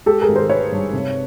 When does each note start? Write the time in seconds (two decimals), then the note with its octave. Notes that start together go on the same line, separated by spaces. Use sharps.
0.06 G#3 G4 A4
0.21 G#4 A#4
0.28 G#1
0.36 A#4 C5
0.50 G#3 B4 C#5
0.72 G2
0.93 C3